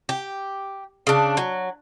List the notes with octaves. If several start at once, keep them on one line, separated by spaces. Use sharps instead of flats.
G4
C#3 D4
F#3